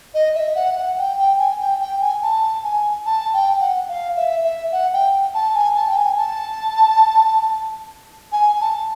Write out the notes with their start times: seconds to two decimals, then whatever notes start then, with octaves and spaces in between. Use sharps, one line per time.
0.14 D#5
0.35 E5
0.55 F#5
0.77 F#5
0.98 G5
1.18 G5
1.39 G#5
1.60 G5
1.80 G5
2.01 G#5
2.23 A5
2.64 G#5
3.06 A5
3.34 G5
3.60 F#5
3.89 F5
4.17 E5
4.44 E5
4.72 F#5
4.93 G5
5.34 A5
5.55 G#5
5.76 A5
5.88 G5
5.97 G#5
6.17 A5
8.32 G#5
8.61 A5